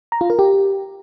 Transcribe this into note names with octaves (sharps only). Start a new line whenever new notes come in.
A#5
F4
A#4
G4